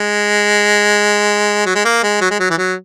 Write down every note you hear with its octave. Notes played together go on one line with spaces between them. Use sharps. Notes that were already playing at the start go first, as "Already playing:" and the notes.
Already playing: G#3
F#3
G#3
A#3
G#3
F#3
G#3
F#3
E3
F#3